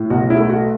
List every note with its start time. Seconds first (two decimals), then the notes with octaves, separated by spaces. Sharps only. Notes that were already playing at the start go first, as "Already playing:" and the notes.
Already playing: A2
0.10 B1 F#4
0.30 E4
0.40 A3
0.50 F#4